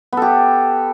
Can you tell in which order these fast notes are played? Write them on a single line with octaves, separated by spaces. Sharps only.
B3 A4 G4